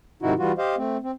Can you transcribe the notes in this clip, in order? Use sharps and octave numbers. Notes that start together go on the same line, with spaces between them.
G#2 C3 D#3 D#4 E4 F#4
E3 G3 F4 F#4
G4 C5 D#5 F5
A3 C4
C4